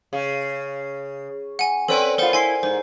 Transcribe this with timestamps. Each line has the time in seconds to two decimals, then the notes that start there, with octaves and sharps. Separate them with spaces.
0.13 C#3
1.59 F#5 G#5
1.88 C4 C#4 A4 B4 D5 G5
2.18 B3 F4 A#4 C5 F#5
2.33 E4 G#5 C6 C7
2.63 G#2 C5